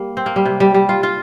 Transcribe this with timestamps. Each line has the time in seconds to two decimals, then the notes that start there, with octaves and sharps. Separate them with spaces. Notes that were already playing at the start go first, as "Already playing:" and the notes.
Already playing: G3 A#3
0.17 C4
0.26 A#3
0.36 G3
0.45 C3
0.60 G3
0.75 G3
0.89 F4
1.03 F4